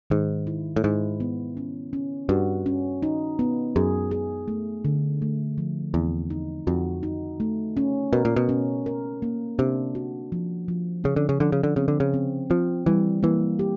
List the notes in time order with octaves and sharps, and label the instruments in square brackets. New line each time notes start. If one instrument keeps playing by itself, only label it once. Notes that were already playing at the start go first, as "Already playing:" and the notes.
[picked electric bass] G#2 [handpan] D#3
[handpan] E4
[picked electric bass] A2
[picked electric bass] G#2 [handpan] E4
[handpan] B3
C#4
C#4
[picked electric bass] G2 [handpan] F#4
[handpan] C#4
D#4
B3
[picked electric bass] F#2 [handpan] G#4
[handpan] G#4
A3
D3
A3
F3
[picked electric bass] E2 [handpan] C4
[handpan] D#4
[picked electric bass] F2 [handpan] F#4
[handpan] D#4
A3
C#4
[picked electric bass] B2 [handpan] A#4
[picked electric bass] A#2
B2
[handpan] C#4
A#4
A#3
[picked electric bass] C3 [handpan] D4
[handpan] F#4
F3
F3
[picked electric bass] C#3 [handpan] C#4
[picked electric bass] D3
C#3
[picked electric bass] D3 [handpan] F3
[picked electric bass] C#3
D3
[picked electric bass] C#3 [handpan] C4
[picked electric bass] D3
C#3
[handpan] C4
[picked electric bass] F3 [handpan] C4
[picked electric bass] E3 [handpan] G3
[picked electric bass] E3 [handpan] A#3
[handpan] G4